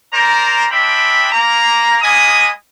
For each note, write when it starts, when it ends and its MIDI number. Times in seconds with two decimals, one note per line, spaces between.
0.13 0.66 70
0.13 0.66 72
0.13 0.66 74
0.13 0.66 82
0.71 1.32 56
0.71 1.32 60
0.71 1.32 62
0.71 1.32 76
0.71 1.32 79
0.71 1.32 83
1.32 1.97 58
1.32 1.97 82
2.02 2.50 56
2.02 2.50 58
2.02 2.50 75
2.02 2.50 80
2.02 2.50 83
2.02 2.50 87